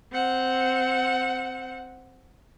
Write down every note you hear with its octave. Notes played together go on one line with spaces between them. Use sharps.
C4 F#5